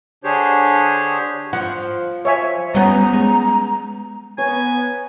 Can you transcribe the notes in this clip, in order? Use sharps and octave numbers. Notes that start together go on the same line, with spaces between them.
D3 D4 G4 G#4 C5 C#5
F3 F#5
C#5 E5 G#5
G3 B3 C#4 A#5
G#3
B3 C#5 G#5 A#5